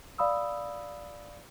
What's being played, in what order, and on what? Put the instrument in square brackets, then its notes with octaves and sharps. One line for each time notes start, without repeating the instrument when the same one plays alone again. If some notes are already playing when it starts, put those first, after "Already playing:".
[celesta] D5 F5 B5 D#6 E6